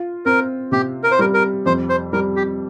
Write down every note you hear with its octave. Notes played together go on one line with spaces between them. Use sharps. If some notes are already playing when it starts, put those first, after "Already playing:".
Already playing: F4
C4 A#4
C3 G4
A#4
C5
G3 A#4
A#4
F2 C5
C5
G3 A#4
G4